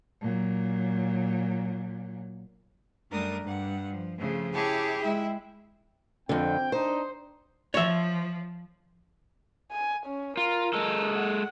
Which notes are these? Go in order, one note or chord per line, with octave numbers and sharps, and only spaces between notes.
A#2 F#3
F#2 G3 A3 D4 A#4 D#6
G2 F#5
F3
C#3 F3 A3
E4 G4 G#4 C#5 A5
G#3 E4 E5 G5
F2 D3 C4 G5
D4 D#4 C5
F3 C#5 E5
G#5
C#4
F4 A#4
G#3 A4
F#5